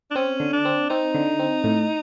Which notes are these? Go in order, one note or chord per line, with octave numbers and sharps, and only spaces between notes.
D4
C4 C#4
D3
D4
C4
C4 D#4
D3
C4
A2